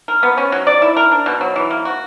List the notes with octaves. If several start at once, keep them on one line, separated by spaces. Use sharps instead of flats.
A#4
B3
C#4
F#3
D5
E4
A#4
D4
B2
F#3
E3
A#3
F#4